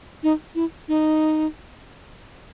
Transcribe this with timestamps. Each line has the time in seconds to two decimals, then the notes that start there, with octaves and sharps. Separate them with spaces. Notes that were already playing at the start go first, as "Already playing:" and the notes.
0.23 D#4
0.55 E4
0.88 D#4